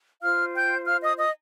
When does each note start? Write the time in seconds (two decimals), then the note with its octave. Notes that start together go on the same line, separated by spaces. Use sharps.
0.22 F4 C5 F5 F6
0.54 G5 G6
0.85 F5 F6
1.02 D#5 D#6
1.18 D#5 D#6